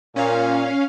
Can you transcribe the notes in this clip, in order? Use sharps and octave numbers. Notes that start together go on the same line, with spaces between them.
A#2 C#4 F5